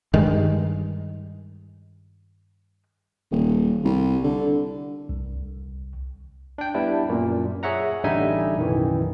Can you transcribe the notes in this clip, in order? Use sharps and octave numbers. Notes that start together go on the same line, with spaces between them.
G2 D#3 G#3
D#1
C2
D3
C2
D4 G5
G3 B3 D4 E4
F#2 A#2
G#4 C#5 E5 F#5 A#5
A1 D3 G3 D#4 E5 G#5
B1 F#2 D#3 E3